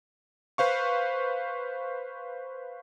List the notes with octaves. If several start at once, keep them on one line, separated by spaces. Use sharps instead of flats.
B4 C5 F5 C#6